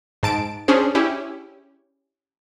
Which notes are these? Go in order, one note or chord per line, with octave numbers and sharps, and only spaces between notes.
G#2 A5 D7
C#4 D4 G#4 C5
C#4 E4 G4